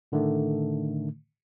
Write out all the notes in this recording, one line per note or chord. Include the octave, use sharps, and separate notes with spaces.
A2 D3 D#3 A3